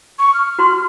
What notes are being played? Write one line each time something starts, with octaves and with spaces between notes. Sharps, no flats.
C#6
F6
F#4 C6